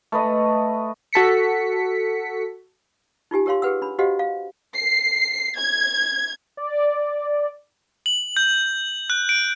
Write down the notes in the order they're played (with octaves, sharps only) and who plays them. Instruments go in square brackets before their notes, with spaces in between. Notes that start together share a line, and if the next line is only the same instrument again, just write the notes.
[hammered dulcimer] A3 B4 D#5
[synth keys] F#4 A4 B6 C#7
[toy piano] D#4 F4 G4 G#5
G4 A#4 C#5 F5 C6
G4 G#4 A#4 B4 F#5 E6
D4 B5
F#4 G4 C5 D#5 F5 F#5
F5
[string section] C7
G#6
[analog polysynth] D5
[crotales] F#7
G6
F#6
D7